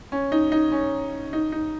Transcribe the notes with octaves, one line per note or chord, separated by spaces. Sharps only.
C#4
D#4
D#4
C#4
D#4
D#4